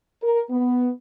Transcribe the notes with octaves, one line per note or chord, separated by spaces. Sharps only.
A#4
B3